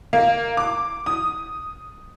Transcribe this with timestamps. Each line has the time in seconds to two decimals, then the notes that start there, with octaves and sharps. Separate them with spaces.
0.13 A#3
0.57 D6
1.06 D#6